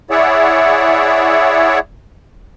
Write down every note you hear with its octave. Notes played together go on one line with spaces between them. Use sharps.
E4 G#4 C#5 D5 E5 F#5